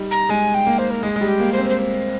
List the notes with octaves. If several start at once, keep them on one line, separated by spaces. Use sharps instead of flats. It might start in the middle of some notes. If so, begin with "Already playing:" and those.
Already playing: G3 D#4
A#5
G#3 G#5
G5
A#3
C5
A#4
G#3 G#4
G#3
G3
G4
A#3
C5
C4
C5